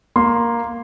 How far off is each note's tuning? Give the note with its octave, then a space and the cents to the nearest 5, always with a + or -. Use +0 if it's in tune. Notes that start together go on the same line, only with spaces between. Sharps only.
A#3 +5 C6 +0